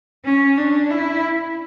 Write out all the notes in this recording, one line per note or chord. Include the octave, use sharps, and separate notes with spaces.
C#4
D4
E4